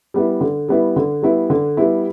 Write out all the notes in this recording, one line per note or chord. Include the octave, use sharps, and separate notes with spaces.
G3 B3 E4
D3
G3 B3 E4
D3
G3 B3 E4
D3
G3 B3 E4